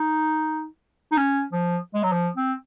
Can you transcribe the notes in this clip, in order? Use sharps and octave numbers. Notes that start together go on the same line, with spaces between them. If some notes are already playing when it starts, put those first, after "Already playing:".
Already playing: D#4
D#4
C#4
F3
G#3
F#3
F3
C4